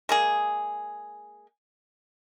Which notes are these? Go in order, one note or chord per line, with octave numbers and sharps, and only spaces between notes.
G#3 A#3 G#4